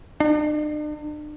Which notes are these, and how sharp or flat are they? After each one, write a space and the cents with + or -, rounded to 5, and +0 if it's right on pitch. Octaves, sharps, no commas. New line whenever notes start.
D4 +45